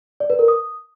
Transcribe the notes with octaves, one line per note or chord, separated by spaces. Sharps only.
D5
B4
A#4
D#6